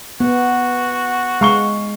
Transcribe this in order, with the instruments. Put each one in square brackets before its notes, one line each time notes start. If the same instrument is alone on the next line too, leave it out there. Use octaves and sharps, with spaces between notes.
[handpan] B3 [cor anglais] F#4
[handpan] G#3 [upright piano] F5 C#6 G7